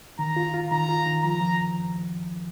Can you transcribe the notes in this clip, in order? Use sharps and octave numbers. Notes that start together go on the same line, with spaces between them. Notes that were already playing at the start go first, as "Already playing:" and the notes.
D#3 A#5
F4
F4
D#3 A#5
F4
D#3
F3 A#5
F3